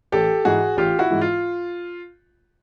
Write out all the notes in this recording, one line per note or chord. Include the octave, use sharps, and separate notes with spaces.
A1 G4 A4
G#2 E3 G#3 F#4 G#4
A1 F4 G4
E4 F#4
G#2 E3 G#3
F4